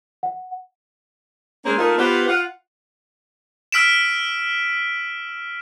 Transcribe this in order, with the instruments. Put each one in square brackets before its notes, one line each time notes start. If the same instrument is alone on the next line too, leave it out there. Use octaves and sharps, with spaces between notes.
[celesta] F#5
[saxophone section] G#3 A#3 C4 C#4 G#4 C5
A3 A#3 D#4 F4 A#4
B3 F4 G4 B4 C5 F#5
F4 F#5
[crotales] E6 F6 B6 D7 E7